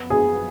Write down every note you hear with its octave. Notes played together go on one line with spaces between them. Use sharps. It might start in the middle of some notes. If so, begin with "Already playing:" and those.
Already playing: F#2 F3 B3
G#4